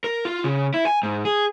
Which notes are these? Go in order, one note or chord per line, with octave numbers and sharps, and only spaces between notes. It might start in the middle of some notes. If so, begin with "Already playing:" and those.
A#4
F4
C#3
E4
G#5
G#2
G#4